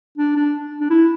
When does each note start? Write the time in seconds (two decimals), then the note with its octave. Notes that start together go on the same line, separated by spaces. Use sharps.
0.18 D4
0.36 D4
0.81 D4
0.90 E4